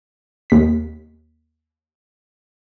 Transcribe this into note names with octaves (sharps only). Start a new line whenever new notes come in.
D#2 B6